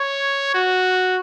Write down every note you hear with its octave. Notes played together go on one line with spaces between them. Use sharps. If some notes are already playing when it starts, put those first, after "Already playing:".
Already playing: C#5
F#4